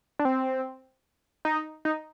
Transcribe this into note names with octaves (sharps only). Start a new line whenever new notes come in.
D4
C4
D#4
D#4